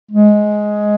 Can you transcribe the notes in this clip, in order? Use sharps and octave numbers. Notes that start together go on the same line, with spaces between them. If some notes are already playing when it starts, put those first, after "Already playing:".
G#3